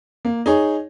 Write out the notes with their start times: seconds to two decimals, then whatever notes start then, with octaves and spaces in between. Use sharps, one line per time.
0.25 A#3
0.46 D#4 G#4 C#5